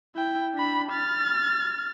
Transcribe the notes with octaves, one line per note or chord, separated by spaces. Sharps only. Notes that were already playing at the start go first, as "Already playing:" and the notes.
E4 G5
D4 B5
F6 A6